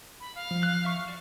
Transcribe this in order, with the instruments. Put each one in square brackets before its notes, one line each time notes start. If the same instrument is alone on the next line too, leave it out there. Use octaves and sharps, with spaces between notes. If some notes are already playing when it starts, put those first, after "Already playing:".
[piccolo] B5
F5
[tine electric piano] F3
[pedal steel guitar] F#6
E5 C#6
F#4 D5 C#6